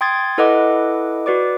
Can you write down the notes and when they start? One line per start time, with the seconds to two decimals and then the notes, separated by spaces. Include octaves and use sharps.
0.01 G5 C6 D#6 G#6 A6
0.38 E4 A4 B4 D#5 F#5 D6
1.26 F#4 B4 D5 D6